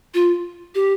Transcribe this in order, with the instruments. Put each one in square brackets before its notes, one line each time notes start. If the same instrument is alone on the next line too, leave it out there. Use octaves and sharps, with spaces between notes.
[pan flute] F4
G4